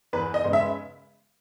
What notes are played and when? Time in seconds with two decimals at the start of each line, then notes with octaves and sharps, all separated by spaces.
0.13 E2 B4
0.34 D#5
0.44 C#3 G#3 B3
0.53 E5